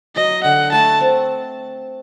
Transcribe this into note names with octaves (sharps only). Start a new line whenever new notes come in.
F#3 D#5
D3 F#5
A3 A5
C4